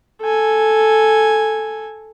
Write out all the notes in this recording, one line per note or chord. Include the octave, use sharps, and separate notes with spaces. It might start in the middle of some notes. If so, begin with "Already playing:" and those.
A4 G#5